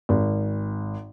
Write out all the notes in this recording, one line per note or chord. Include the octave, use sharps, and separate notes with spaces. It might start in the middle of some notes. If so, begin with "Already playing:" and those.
G#1